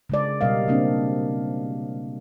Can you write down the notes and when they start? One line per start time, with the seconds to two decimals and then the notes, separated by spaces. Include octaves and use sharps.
0.10 C#3 G#3 D5
0.41 B2 G3 A#4 D#5 F5
0.68 C#3 A#3 C4 D4